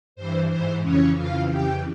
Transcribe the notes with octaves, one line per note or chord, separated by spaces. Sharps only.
G2 E3 C5
G#2 E3 C5
F2 C#3 E3 C#4 C#5
F2 C#3 E3 F4 F5
F2 C#3 E3 G4 G5